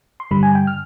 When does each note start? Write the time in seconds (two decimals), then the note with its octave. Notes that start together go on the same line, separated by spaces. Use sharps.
0.20 C6
0.31 G2 D3 G3 B5
0.43 G#5
0.55 G5
0.67 F6